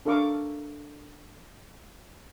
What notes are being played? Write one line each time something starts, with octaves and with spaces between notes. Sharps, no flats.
D4 A4 A#4 F5 C#6 D6